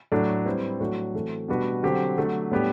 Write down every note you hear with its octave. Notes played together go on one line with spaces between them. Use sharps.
A2 F#3 A3 D4
G3 C4 E4 B4
A2 F#3 A3 D4 F#4
E3 A3 C4 F#4 A4
B2 G3 D4 F#4 B4
D3 F#3 C4 G4
D3 F#3 A3
A2 G3 B3 D4 G4